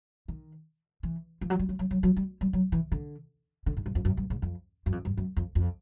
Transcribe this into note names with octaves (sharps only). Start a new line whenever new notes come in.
D#3
E3
F3
F#3
G3
F#3
F#3
F#3
F#3
G3
G3
F#3
E3
D3
D3
G#2
G2
F2
F#2
G2
G#2
F2
F#2
F2
G2
F#2
F2
F2